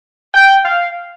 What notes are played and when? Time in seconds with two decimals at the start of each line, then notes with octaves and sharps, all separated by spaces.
0.33 G5
0.65 F5